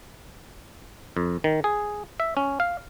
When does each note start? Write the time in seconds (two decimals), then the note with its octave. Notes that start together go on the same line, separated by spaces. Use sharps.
1.17 F2
1.44 D#3
1.64 G#4
2.20 E5
2.37 C#4
2.60 F5